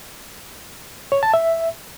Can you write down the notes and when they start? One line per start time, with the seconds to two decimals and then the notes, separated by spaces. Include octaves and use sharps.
1.12 C#5
1.23 A5
1.34 E5